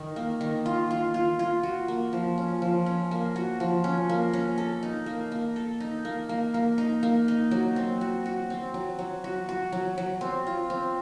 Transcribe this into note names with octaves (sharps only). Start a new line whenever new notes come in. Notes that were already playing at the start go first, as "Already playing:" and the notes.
Already playing: D#3
A#3
D#3
F4
F4
F4
F4
F#4
A#3
F3
C#4
F3
C#4
A#3
F#4
F3
C#4
A#3
C#4
A4
D#4
A#3
A#3
A4
D#4
A#3
A#3
A#3
D#4
A#3
D#4
F#3
C4
F#4
F#4
C4
F#3
F#3
F#4
F#4
F#3
F#3
C4
F4
C4